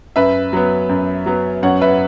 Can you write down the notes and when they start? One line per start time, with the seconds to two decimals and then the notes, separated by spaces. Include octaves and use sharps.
0.16 F#2 B4 E5
0.53 F#3 B3
0.89 F#2
1.26 F#3 B3
1.63 F#2 C#5 F#5
1.81 B4 E5